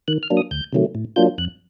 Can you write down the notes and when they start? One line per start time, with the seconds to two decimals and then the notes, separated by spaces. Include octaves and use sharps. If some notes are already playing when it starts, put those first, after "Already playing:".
0.08 D#3 F#6
0.23 F6
0.30 F#3 A#3 D4
0.37 D#6
0.51 D2 G6
0.73 C3 D#3 F#3 A3
0.95 A2
1.16 F#3 A#3 D4 F4 G6
1.38 F2 F#6